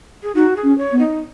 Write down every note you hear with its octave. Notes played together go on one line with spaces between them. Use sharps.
G#4
D#4 F#4
G#4
C#4
C#5
B3
D#4